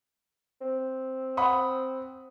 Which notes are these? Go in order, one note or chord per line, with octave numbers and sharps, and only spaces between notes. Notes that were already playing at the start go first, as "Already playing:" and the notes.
C4
F#5 B5 D#6